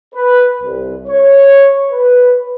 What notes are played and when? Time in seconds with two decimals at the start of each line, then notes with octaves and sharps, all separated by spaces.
0.14 B4
0.62 C2
1.07 C#5
1.90 B4